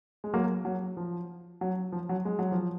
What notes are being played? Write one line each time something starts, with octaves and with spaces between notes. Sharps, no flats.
G#3
F#3 A#3
F#3
F3
F#3
F3
F#3
G#3
F#3
F3